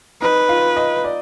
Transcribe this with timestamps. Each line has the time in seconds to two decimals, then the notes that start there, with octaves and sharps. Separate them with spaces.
0.22 D#4 B4
0.49 F4
0.77 D#5
1.04 D5